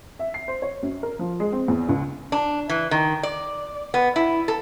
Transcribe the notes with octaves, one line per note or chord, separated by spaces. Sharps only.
E5
C7
C5
C#5
F#2
A#4
F3
G#3
C4
E2
C#2
D4
E3
D#3
D5
B3
E4
A4